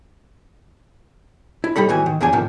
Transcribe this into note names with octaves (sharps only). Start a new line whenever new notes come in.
E4
A2 G3 D#4 A4 B5
A2 D#3 E3 F#4 G#5
D#3
E2 C#3 F3 D4 G4 G#5
A2 C3 D#3 F3